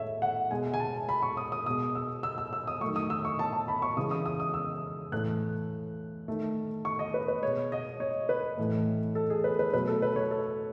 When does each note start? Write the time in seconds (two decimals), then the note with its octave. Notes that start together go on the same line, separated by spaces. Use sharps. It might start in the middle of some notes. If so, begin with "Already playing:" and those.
Already playing: A2 G#3 A4 C#5 E5
0.22 F#5
0.51 B2 G#3 G#5
0.74 G#5
0.80 A5
1.09 B5
1.23 C#6
1.37 D#6
1.52 D#6
1.66 B2 G#3 D#6
1.95 E6
2.23 E6
2.38 E6
2.53 E6
2.67 D#6
2.81 D#3 F#3 A3 C#6
2.96 D#6
3.10 E6
3.25 C#6
3.39 A5
3.53 A5
3.68 B5
3.82 C#6
3.97 C#3 E3 G#3 D#6
4.11 D#6
4.26 D#6
4.40 D#6
4.54 E6
5.12 A2 E3 A3 F#6
6.28 D#3 A3
6.85 C#6
6.99 D#5
7.14 B4
7.28 B4
7.43 B2 G#3 C#5
7.72 D#5
8.00 C#5
8.29 B4
8.58 A2 E3 A3
9.15 A4
9.30 G#4
9.44 B4
9.59 B4
9.73 B2 F#3 A3 B4
9.87 A4
10.02 B4
10.16 C#5
10.31 A4